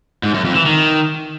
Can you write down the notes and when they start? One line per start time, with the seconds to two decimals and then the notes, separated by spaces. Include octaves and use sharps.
0.23 G#2
0.34 F#2
0.45 F2
0.55 E3
0.66 D#3